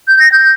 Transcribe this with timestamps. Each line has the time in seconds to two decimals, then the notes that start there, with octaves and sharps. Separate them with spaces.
0.08 G6
0.19 A#6
0.32 G6